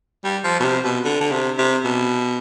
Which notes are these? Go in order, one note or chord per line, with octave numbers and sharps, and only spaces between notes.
G3
F3
B2
C3
B2
D3
D3
C3
C3
B2